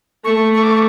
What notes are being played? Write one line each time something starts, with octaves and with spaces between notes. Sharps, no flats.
A3 C#6
C#6
D6
C#6